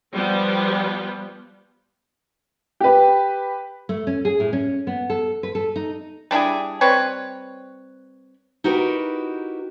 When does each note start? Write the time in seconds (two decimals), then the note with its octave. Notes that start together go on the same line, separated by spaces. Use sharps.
0.12 F3 G3 B3
2.80 G4 B4
3.89 A3
4.07 C#4
4.25 G#4
4.40 A2
4.53 C#4
4.87 B3
5.10 A4
5.43 B4
5.55 A4
5.76 D#4
6.31 G3 D4 E4 G#4
6.81 G3 C4 B4 C#5
8.64 D#4 E4 F#4 G4 A#4 B4